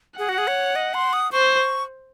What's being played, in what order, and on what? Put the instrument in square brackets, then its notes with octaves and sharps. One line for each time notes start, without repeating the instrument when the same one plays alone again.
[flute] G#4 [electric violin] F#5
[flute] F#4
G#4
C#5
D#5
C6
D#6
[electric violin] C5 [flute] C#6